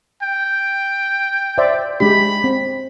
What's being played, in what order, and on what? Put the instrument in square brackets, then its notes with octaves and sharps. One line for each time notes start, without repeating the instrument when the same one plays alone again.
[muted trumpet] G5
[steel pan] C5 D5 E5
[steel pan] G#3 D4 G4 [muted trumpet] B5
[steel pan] C4